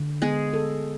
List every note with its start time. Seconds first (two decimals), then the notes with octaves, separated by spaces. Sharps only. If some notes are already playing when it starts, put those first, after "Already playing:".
Already playing: D3
0.22 G#3 B3 G#4
0.54 A4